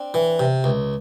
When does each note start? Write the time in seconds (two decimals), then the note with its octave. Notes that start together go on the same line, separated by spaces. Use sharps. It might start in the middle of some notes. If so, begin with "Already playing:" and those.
Already playing: C4 D4
0.14 E3
0.39 C3
0.64 C#2